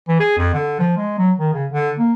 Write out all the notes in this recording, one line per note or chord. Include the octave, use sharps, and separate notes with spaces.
E3
G#4
F2
D3
F3
G#3
F#3
D#3
C#3
D3
A#3